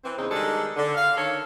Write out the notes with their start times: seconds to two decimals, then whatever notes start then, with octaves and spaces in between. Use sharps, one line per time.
0.03 E3 C4
0.17 E2 C#3 D#4 C5
0.31 D#3 G3 G#3 D4 A4
0.76 D3
0.95 F5
1.16 D3 D#3 A4 C#5